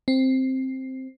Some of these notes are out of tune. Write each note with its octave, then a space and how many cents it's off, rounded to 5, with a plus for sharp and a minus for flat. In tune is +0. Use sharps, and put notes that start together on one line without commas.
C4 +5